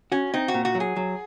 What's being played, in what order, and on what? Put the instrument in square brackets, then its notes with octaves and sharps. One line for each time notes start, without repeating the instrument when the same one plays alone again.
[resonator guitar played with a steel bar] C#4 [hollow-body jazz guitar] F#4
[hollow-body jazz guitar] C4 [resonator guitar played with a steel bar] D#4
[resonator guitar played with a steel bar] F#4
[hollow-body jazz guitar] A#2
[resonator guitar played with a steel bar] F#4
[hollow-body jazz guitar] F#3
[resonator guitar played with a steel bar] G#4
[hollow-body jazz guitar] F#3